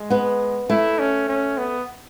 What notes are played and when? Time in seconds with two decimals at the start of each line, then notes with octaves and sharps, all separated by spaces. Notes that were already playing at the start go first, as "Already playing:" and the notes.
Already playing: G#3
0.10 B3 B4
0.69 A3 E4 A4
0.99 C#4
1.29 C#4
1.58 B3